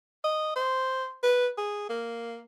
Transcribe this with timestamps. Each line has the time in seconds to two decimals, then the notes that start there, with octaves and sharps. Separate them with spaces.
0.24 D#5
0.56 C5
1.23 B4
1.58 G#4
1.90 A#3